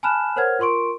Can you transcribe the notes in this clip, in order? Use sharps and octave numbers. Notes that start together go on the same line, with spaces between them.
G#5 A5 B5 F6 F#6 E7
A#4 C5 C#5 F#5 F6 G#6
F4 A#4 C6 C#6 D7